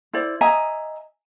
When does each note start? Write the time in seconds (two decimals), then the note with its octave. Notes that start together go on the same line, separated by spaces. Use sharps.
0.13 E4 C5 D5
0.41 D#5 E5 G#5 A#5